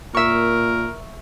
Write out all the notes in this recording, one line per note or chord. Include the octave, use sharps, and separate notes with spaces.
A#2 A#4 E5 C#6